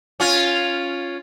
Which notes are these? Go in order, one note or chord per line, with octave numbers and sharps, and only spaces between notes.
C#4 F4